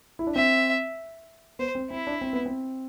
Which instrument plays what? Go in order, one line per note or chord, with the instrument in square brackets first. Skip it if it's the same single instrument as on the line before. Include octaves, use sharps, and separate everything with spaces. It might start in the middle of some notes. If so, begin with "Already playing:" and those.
[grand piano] E4
D4
[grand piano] C4 [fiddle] E5
[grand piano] B3 [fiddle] C5
[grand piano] C4
[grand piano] C4 [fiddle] E4
[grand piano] D4
C4
B3
C4